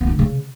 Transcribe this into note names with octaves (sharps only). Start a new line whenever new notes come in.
B3
F4
D3
C#3